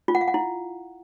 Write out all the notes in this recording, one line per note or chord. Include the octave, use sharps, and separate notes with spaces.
F4
F#5
F5
F#5
E4